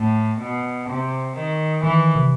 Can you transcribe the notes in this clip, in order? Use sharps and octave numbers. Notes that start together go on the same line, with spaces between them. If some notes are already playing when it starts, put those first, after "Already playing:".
Already playing: A2
B2
C3
D#3
D#3 E3
C3